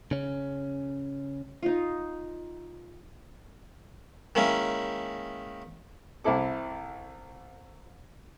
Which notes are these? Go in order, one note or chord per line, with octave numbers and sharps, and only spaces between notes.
C#3 C#4
D#4 F4
D#3 G#3 A#3 C#4 E4
C2 C4 E4 A4 D6